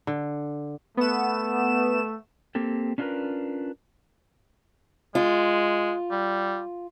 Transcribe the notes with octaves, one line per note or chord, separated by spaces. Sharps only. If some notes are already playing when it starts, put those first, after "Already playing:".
D3
A3 B3 E7
A#3 C4 G4 A4
C#4 D4 F4 G#4 A#4 B4
G#3 F4
G3